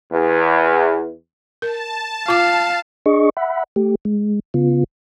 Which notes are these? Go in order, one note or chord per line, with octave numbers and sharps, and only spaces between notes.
E2
A#4 A5
F4 F5 D6
D4 G#4 D#5 C#6
E5 F#5 B5
A3 G4
G#3
C#3 B3 F4